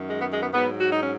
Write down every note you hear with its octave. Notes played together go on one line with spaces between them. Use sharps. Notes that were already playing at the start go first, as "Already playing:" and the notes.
Already playing: F#2 D#3
G#3
B3
G#3
B3
G#2 F#3 B3
F#4
D#4
C#4